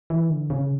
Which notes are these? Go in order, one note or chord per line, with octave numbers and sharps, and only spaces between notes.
E3
D3
C#3